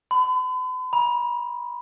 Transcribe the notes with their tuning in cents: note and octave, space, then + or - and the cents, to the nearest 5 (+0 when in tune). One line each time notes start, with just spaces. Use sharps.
B5 +45
B5 -45